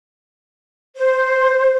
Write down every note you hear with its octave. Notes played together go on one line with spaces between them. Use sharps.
C5